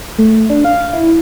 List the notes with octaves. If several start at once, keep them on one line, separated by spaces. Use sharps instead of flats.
A3
D4
F5
E4